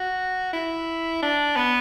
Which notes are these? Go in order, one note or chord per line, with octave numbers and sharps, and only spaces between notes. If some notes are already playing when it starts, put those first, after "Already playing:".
Already playing: F#4
E4
D4
B3